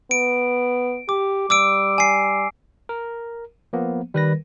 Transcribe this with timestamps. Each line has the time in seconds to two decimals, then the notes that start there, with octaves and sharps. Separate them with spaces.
0.11 B3 D7
1.09 G4 D6
1.50 G3 D6 E6 D7
1.98 G#5 C7
2.89 A#4
3.73 F3 A#3 B3
4.14 D#3 G3 B4 A#6